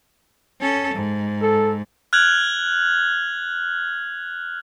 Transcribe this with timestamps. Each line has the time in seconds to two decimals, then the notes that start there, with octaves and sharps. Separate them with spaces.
0.60 C#4 A4
0.94 G#2
1.42 A4
2.13 F6 F#6 G#6 F7 F#7